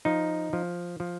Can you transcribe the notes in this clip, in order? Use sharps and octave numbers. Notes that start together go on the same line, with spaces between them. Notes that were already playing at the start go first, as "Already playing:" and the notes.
F3 D#4
F3
F3